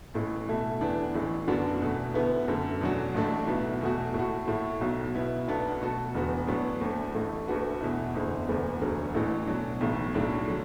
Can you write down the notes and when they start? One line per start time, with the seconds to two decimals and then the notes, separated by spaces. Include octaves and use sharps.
0.14 A1 A2 E3
0.48 B2 A3 E4 A4
0.81 E2 E3 D4 B4
1.14 A1 A2 E3
1.47 F#2 D3 B3 D4 F#4
1.81 E2 B2 A3
2.14 D2 D3 B3 E4 B4
2.48 F#2 D3 A3
2.81 E2 B2 F#3 D4 F#4
3.14 A1 A2 A3 D4
3.47 B1 B2 B3 E4
3.81 E2 B2 A3 F#4
4.14 A2 A3 F#4
4.48 A2 A3 E4
4.81 B1 B2 F#3
5.15 B2 B3 E4
5.47 B1 B2 B3 D4 A4
5.81 B2 A3 F#4 A4
6.15 E1 E2 D3 B3 F#4
6.48 A2 F#3 B3 D4 B4
6.81 D2 D3 A3
7.15 A1 A2 A3
7.47 D2 D3 A3 F#4 B4
7.81 E2 B2 A3 E4
8.14 F#1 E2 D3
8.47 E1 D2 D3 B3
8.81 E1 D2 D3 F#3
9.14 A1 A2 E3
9.47 B2 F#3 D4
9.81 B1 A2 E3
10.14 B1 A2 F#3 D4
10.48 D3 F#3